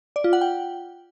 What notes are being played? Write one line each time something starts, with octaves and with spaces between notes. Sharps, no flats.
D5
F4
F#5
G5